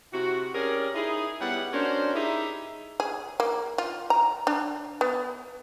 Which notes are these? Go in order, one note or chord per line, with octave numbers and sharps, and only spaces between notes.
C3 E4 F#4
C#4 G4 G#4 A#4 D5
D#4 E4 G#4
G3 B3 C#4 E4 F#5
C#4 D4 F#4 A#4 C5
D#4 E4 G4 G#4 E5
G#4
A#3
F4
A#5
D4
B3